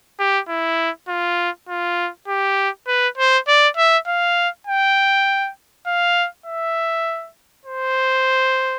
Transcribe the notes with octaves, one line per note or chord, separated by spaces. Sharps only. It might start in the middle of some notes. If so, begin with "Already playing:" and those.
G4
E4
F4
F4
G4
B4
C5
D5
E5
F5
G5
F5
E5
C5